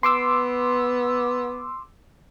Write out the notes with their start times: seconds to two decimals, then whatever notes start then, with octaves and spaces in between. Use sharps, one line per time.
0.03 B3 C6 D6 E6